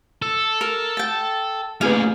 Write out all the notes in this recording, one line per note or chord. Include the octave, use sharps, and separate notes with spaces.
A4
A#4
G5 A5
A#2 C#3 A3 C4 G#4 B4 F5